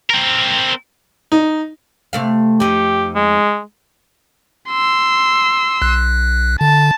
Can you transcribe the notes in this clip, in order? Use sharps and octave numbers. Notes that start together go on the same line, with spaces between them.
C4 A#4
D#4
C3 A3 F5
F2 D#4 G4
G#3
C6 E6
B1 F#6
D3 A5